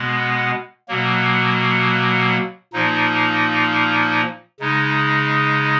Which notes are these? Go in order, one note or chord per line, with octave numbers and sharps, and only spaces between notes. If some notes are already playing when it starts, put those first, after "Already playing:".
Already playing: B2 G#3 B3
B2 F#3 A#3
A#2 F3 A#3 D#4
C#3 G#3 D#4